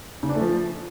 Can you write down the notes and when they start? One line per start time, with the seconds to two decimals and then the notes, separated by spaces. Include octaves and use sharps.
0.23 C#3
0.29 D4
0.35 A3
0.41 F3